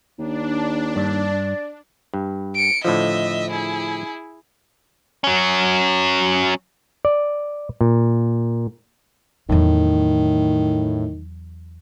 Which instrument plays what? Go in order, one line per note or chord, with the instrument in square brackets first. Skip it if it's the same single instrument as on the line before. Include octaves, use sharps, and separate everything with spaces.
[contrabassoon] D#2 [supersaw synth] D4
[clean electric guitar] G2 [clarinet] D5
[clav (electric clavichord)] G2
[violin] C#7 D7
[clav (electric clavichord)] A2 D3 F3 [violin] D#5 E5
[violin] E4 G#4
[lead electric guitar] F#3 C#4
[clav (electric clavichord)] D5
A#2
[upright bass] E2 F#3 [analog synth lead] A2 [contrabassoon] D#3